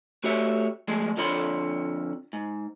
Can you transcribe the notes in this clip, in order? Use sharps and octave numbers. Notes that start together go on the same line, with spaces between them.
A3 F#4 G4 C#5 E5
F3 G#3 A3 G#4
F2 D3 F4 C#5 B5 C6
G#2